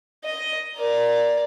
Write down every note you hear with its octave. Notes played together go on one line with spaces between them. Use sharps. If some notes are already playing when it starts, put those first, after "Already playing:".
D#5
A#4 D5